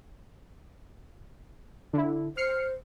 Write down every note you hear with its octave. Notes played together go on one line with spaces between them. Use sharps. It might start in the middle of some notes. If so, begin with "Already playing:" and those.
D3 E4
C5 F6 C7 C#7